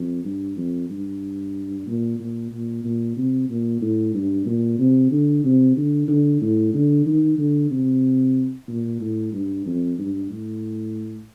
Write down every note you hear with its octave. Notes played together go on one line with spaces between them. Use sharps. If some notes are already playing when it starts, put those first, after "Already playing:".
Already playing: F2
G2
F2
G2
A#2
A#2
A#2
A#2
C3
A#2
A2
G2
A#2
C3
D3
C3
D3
D3
A2
D3
D#3
D3
C3
A#2
A2
G2
F2
G2
A2